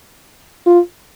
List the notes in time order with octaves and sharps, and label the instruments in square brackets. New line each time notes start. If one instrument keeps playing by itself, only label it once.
[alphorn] F4